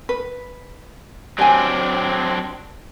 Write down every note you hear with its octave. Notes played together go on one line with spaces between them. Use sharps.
B4
F#3 C4 D4 G4 G#5